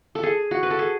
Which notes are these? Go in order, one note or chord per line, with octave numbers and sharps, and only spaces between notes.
A4
G#4
F#4
B4
A4
G#4